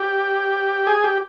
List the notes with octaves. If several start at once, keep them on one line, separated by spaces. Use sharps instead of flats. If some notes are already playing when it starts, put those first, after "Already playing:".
Already playing: G4
G#4
G4